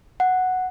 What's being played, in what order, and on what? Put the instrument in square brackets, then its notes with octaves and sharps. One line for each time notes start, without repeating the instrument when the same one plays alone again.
[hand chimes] F#5